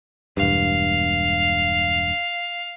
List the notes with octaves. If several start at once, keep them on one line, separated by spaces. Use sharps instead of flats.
E1 G2 F5